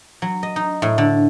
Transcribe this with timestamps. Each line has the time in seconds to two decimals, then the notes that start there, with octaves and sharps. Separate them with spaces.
0.22 F#3
0.43 D#5
0.56 D#4
0.82 A2
0.98 D3